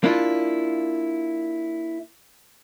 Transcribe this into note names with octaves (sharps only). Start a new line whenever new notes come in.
A#3 D4 E4 F4